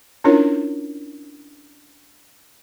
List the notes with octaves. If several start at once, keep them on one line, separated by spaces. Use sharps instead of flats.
C#4 D4 E4 F4 A#4 C#5